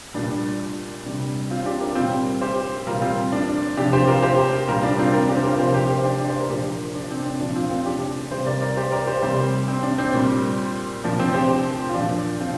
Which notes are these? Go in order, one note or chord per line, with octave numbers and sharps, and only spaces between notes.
A#2 G3 D4
C3 G3 D4
C4 F4
D4 G4
F4 A#4
A#2 G3 C4 F4
G4 C5
A#2 G3 F4 A#4
C4 F4
D4
C3 F3 D4 G4
G4 C5
F4 A#4
G4 C5
A#2 G3 F4 A#4
D4
C4 F4
F4 A#4
D4 G4
C5
F4 A#4
C3 F3 G4 C5
G4 C5
G4 C5
D4 G4
D5
C5
A#4
A#2 F3 D4 G4
D4
C4
D4
A#2 F3 D4
C4 F4
C4 F4
D4 G4
C3 G3 G4 C5
A#4 D5
A#4 D5
G4 C5
A#4 D5
G4 C5
C3 G3 G4 C5
C4
D4
C4
A#2 G3
A#2 F3 D4
C4
G4 C5
F4
A#2 F3 D4
C4 F4